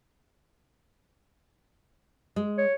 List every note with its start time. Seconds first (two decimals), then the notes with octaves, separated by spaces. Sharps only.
2.36 G#3
2.58 C#5